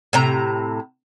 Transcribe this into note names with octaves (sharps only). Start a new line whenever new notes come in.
A2 C3 A#5